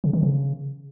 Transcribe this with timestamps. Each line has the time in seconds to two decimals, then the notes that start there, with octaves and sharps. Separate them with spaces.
0.04 C#3
0.13 D#3
0.23 C#3